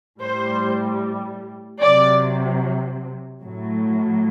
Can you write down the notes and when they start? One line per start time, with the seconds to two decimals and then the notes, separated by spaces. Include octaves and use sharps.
0.21 A2 G3 C5
1.81 C3 F#3 D5
3.41 A2 F#3